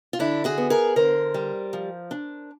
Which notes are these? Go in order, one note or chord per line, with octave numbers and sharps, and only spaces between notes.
F4
D3 D4 E4
F#4 G#4
B3
G#4 A#4
D3 A#4 C5
G3
F3
D4